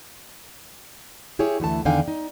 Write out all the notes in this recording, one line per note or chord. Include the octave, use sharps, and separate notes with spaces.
E4 G4 G#4 C#5
D2 E3 A3 A5
E2 D3 D#3 F5 G5 G#5
D#4